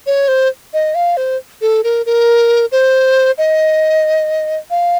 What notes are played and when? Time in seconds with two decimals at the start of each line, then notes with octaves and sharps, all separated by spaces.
0.07 C#5
0.28 C5
0.74 D#5
0.95 F5
1.17 C5
1.61 A4
1.84 A#4
2.06 A#4
2.72 C5
3.38 D#5
4.70 F5